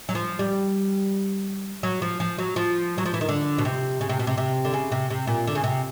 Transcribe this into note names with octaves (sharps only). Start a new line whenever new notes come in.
F#3
F3
G3
F#3
F3
F3
F#3
F3
F#3
F3
E3
D#3
D3
B2
C3
C#3
C3
B2
C3
C3
D3
C#3
C3
C3
A#2
D3
C#3
C3